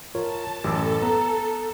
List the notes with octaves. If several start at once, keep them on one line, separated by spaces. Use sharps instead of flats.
F4 A#4 C#5 A5
A1 F#2 G4 A4 D6 E6
B3 A#5